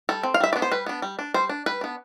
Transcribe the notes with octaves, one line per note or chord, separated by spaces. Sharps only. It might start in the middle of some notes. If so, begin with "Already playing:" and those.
G3 A4
C4
F5
G3 E5
D5
B3 D4
C5
G3 B4
B3 D4
G3
D4
G3 C5
D4
G3 B4
B3 D4